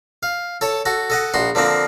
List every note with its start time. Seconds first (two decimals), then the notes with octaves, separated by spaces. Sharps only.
0.23 F5
0.61 A4 C#5 A5
0.86 F#4 A4
1.10 A4 D#5 F#5
1.34 A#1 F#4 C6
1.55 D3 F3 A#3 C4